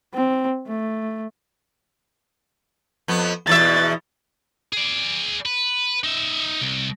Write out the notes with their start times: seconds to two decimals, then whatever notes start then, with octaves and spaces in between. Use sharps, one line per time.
0.14 C4
0.67 A3
3.08 F2 B3
3.47 E2 B2 E5 A6
4.73 G#4 D5
5.46 B4
6.04 D#4 E5
6.61 C2